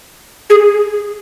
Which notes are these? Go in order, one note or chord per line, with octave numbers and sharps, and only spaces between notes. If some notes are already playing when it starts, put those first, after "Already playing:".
G#4